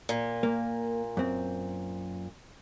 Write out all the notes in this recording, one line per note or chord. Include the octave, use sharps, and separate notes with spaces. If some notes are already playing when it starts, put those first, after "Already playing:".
A#2
A#3
F#2 C4